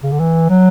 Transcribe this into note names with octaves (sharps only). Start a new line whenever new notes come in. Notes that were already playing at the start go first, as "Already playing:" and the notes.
C#3
D3
E3
F#3